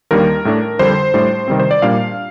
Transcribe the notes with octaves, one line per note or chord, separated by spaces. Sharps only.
D#2 D#3 G3 A#3 D4 A#4
A2 A3 D4
F2 D3 G3 C5
A2 G3 D4
C3 D#3 G3 C4
C5
D5
A#2 G3 A#3 D4 F5